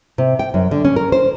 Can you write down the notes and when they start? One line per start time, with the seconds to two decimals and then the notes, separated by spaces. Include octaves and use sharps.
0.18 C3
0.39 G5
0.54 F#2
0.71 D3
0.85 C#4
0.96 A#4
1.12 C5